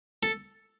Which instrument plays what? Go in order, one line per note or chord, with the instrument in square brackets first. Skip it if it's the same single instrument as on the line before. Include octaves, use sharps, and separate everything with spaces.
[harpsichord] A4